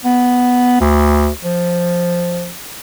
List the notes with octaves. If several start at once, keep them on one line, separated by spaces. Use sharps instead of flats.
B3
D2
F3